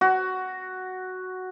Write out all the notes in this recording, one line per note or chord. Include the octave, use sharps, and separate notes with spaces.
F#4